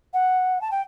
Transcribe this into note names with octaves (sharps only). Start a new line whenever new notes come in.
F#5
A5
G5